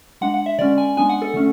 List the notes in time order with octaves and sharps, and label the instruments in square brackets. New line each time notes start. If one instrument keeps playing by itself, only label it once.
[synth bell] G#3 D4 F#5
F#5
E5
D3 G#3 C#4 D5
G#5
G#3 B3 D4 G#5
F#5
A4
D3 A3 C#4